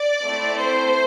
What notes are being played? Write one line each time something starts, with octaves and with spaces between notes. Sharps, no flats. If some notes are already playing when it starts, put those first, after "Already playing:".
Already playing: D5
A3 C4 E4
C5